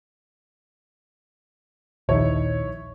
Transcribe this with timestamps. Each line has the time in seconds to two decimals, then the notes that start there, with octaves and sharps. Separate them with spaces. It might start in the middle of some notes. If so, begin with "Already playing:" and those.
2.09 A#1 D#2 D#4 E4 C#5